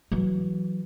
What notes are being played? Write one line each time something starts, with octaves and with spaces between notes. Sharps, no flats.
E3 F#3